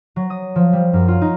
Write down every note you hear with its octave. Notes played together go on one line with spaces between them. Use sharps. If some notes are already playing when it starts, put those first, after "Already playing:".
F#3
D#6
F3
G3
F#2
F4
D#4